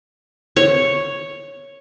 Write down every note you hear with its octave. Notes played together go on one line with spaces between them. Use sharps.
C#5